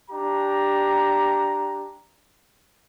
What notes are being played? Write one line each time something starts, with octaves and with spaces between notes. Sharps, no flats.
D4 G4 A#5